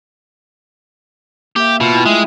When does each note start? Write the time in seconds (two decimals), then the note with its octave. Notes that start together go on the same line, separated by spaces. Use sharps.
1.56 A#3 G4 E5
1.81 B2 F4 F6
1.94 E4 G5
2.06 G#3 A3 E5